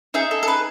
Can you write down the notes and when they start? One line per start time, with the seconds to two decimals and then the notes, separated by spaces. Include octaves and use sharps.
0.14 D#4 G#4 E5
0.31 A4
0.43 A4
0.48 B4